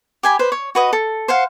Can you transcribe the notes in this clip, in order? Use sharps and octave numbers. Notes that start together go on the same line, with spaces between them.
G4 G#5 B5
B4 C5
C#5
F#4 B4 D#5
A4
C5 F5 F#5